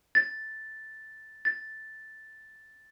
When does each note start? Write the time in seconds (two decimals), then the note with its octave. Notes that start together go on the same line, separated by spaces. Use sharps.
0.15 A6
1.45 A6